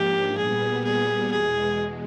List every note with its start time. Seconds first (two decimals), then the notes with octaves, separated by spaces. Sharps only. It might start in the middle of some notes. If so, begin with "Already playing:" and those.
Already playing: G#2 F3 A#3 D4 G4
0.38 A#2 G3 B3 G#4
0.84 G#4
1.31 E2 B2 G#3 G#4